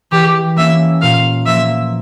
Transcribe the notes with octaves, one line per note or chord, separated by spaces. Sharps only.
E3 G4
A#3 C#4 E5
A#2 F5
F3 A#3 E5